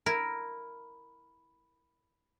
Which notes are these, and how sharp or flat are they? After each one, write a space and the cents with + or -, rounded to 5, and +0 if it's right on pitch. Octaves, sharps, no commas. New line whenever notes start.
E4 +0 A#4 +0